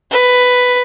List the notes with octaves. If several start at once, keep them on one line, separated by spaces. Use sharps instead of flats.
B4